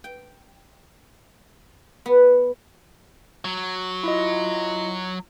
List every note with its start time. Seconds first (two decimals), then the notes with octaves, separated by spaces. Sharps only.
0.04 G5
2.06 B3
3.45 F#3
4.03 E4 F4 D#5